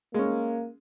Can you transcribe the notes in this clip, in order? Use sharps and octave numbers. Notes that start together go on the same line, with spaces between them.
G#3 A#3 C#4